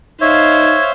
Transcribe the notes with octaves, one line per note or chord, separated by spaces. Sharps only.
D#4 C5 C#5 E5 F5 G#6